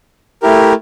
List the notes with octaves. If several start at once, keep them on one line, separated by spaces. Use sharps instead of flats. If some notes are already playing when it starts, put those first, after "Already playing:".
A3 E4 G4 A#4